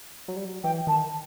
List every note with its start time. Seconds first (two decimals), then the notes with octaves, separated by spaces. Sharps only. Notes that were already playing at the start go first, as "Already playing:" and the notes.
0.28 F#3
0.36 G3
0.45 F#3
0.63 E3 G5
0.87 D#3 A5